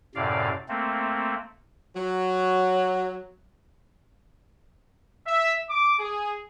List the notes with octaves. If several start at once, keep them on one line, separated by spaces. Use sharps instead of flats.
F#2 A2 C3 D5 F5
A3 A#3 C4
F#3
E5
D6
G#4